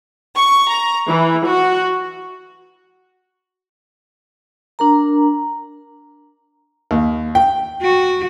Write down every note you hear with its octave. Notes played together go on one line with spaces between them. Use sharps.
C#6
A#5
E3
F#4
D4 A#4 A#5
D#2
G5
F#4